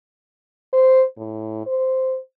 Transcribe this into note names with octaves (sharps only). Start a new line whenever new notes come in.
C5
A2
C5